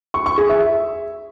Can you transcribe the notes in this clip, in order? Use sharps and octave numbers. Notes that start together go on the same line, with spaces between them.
C#6
C#6
G#4
E5